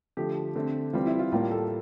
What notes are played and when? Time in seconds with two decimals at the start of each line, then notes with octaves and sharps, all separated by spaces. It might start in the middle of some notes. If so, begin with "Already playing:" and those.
0.17 D3 F3 A3 G4
0.56 D3 A3 C4
0.93 E3 G3 C4 F4
1.07 E4
1.19 F4
1.32 A2 G3 A#3 F4
1.51 A4